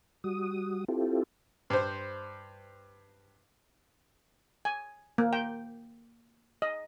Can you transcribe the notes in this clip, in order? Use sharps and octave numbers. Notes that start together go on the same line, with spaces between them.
G3 F#4 D#6
C4 E4 F4 G4 A4
G2 C5
G#5
A#3
G5
D#5